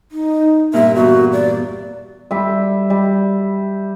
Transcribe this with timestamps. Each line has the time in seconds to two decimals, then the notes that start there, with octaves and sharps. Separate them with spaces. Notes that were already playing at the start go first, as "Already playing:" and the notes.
0.12 D#4
0.74 G2 A#2 E5
0.95 E2 A#2 F#4
1.33 D5
2.31 G3 E5
2.90 G3